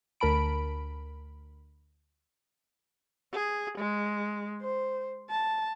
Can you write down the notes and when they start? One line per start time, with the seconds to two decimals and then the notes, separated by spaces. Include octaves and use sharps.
0.20 D2 A#4 A5 B5 D7
3.34 G#4
3.78 G#3
4.61 C5
5.30 A5